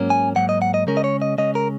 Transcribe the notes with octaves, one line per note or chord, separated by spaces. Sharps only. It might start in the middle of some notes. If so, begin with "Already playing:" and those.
Already playing: G#2 F#3 A#3 C#4
G#5
G#2 F#3 A#3 F#5
D#5
F#5
D#5
C#3 G#3 C#4 A#4
D#5
C#5
D#5
C#3 G#3 C#4 D#5
A#4